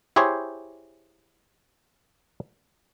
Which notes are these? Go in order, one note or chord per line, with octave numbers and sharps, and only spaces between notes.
E4 G4 G#4 C5 C#5